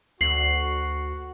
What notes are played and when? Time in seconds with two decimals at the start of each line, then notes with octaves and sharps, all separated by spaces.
0.21 D2 F#4 C7 F#7